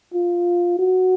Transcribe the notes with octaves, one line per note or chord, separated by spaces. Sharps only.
F4
F#4